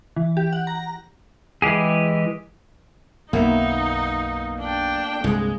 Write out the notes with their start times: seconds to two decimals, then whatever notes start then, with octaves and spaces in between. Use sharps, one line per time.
0.16 E3
0.37 G4
0.53 F#5
0.67 A#5
1.62 E3 G#3 G4 G#4
3.33 B1 F#2 B2 A#3 B3 D#4 E5
4.61 D4 G5
5.24 C2 G2 D3 G#3